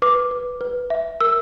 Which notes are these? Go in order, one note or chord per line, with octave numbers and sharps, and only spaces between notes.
B4 D6
B4
B4
E5
A#4 E6